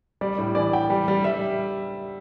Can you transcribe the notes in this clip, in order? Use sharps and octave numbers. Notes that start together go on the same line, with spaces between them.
G3 D5
A2
E3 D5
G3 G5
G3
G3
G3 E5